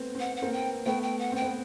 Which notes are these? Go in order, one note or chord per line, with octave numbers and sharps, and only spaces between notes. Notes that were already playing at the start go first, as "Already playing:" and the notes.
Already playing: A3 B3 C4
C4 F#5
F#5
A#3 C4
G5
A3 B3 G5
G5
F#5
C4 G5
B3